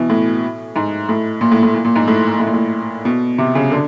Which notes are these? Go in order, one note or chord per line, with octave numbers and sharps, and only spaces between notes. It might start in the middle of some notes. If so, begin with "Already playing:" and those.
Already playing: B2 E3
A2
G#2
A2
A#2
A2
A2
A#2
A#2
G#2
A2
A2
A#2
A2
B2
C3
C#3
D3